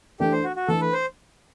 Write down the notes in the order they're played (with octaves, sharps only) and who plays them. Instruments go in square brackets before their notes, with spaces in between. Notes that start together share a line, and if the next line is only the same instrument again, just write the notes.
[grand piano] E3 A3 D4 [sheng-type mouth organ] G4
[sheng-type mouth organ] C5
F#4
F#4
[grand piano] E3 A3 D4 [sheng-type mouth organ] A4
[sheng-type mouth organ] B4
C5